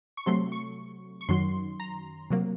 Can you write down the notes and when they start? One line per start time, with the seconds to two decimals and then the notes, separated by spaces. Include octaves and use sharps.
0.17 C#6
0.26 C3 F#3 A3 C6
0.52 C#6
1.21 C#6
1.29 F#2 D#3 F#3 C6
1.80 A#5
2.30 C3 F#3 A#3